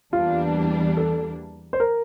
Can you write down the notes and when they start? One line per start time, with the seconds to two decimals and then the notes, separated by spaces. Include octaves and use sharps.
0.13 E2 E3 G3 A#3 D4 F4
0.97 A4
1.73 C5
1.80 A#4